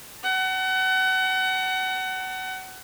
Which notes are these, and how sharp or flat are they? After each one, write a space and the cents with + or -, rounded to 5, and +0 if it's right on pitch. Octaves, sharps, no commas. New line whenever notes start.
F#5 +30 A5 +35